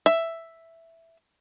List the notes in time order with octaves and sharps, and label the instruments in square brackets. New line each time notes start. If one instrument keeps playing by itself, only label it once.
[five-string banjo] E5